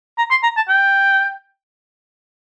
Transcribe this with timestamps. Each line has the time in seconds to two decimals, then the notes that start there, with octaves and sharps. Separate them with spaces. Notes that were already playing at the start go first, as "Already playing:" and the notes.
0.18 A#5
0.31 C6
0.43 A#5
0.56 A5
0.69 G5